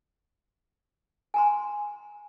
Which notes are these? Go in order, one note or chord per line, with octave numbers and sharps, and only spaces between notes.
G#5 A#5 C6